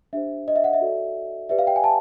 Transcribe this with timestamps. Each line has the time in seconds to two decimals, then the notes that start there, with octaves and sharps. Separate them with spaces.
0.13 D4 G4 C5 E5
0.48 D#5
0.56 E5
0.64 F#5
0.73 E5
0.81 F#4 A4 D5
1.49 G4 B4 D5 E5
1.59 F5
1.67 G5
1.76 G#5
1.84 A5